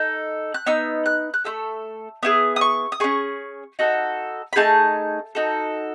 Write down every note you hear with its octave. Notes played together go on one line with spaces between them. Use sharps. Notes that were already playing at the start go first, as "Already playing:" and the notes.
Already playing: D#4 A4
F#6
B3 D#4 E6
F#6
F#6
A3 E4 A4 E6
B3 E4 G#4 D#6
D#6
C#6
D#6
C#4 G#4 C#6
D#4 F#4 A4
B5
A3 D#4 G#4 A5
D#4 F#4 A4